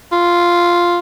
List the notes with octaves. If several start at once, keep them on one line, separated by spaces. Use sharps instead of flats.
F4